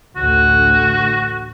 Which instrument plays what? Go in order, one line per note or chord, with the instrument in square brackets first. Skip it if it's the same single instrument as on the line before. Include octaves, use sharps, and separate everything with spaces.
[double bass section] A1 D2 [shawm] F#4